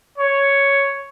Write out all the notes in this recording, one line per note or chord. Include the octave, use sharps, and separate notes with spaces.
C#5